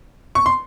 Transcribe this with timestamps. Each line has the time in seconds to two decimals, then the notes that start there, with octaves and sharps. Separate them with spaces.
0.35 C#6
0.46 C6